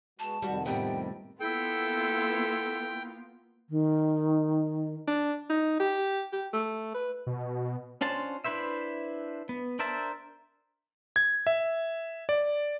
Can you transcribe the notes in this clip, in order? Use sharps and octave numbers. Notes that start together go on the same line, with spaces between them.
G#3 B3 F#4 A5
F2 C3 D#3 G3 F#4
A2 G3 B3 G5
A#3 B3 E4 F4 A4 G5
D#3
D4
D#4
G4
G4
A3
B4
B2
C#4 D4 F4 C5 A5
D4 E4 B4 C5 E5
B3
D4 A#4 C5 E5 A5
G#6
E5
D5